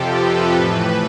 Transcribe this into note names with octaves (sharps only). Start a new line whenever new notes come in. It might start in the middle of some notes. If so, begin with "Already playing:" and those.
Already playing: F2 C3 F3 G4 A4
B4
A2 E3